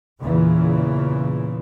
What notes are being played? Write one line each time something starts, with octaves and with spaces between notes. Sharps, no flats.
E2 A#2 C#3 E3